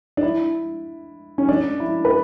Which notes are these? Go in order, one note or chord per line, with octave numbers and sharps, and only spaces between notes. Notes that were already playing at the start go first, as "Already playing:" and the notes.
D4
E4
C#4
D4
E4
B4